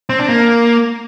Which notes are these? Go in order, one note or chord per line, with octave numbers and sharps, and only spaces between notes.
C4
D4
A#3